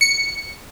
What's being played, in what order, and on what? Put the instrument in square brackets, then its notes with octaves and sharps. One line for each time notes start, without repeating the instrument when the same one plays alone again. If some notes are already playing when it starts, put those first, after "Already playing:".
[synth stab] C#7